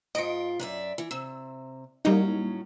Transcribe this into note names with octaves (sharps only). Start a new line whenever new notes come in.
G#2 F4 D#5 C#7 D7
F#2 D5 E5
E3
C3 E6
A2 F#3 G3 A#3 C#4 D#4